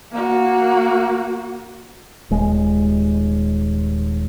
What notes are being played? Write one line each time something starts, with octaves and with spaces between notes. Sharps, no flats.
A#3 F#4
D#1 G#3